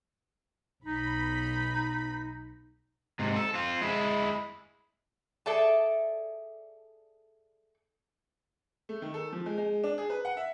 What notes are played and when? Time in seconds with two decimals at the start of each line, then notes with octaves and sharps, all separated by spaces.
0.85 B1 D#4 B5
3.19 G#2 C3
3.36 A4
3.54 C4 F4
3.81 G#3 E4
5.46 G#4 A4 D5 E5 A5
8.89 A3
9.02 D#3
9.14 A4
9.33 F3
9.46 G#3
9.58 G#3
9.84 D4
9.98 G#4
10.10 B4
10.25 F#5
10.37 E5